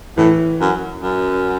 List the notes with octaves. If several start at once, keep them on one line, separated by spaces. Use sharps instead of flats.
A2 E3
F#2
F#2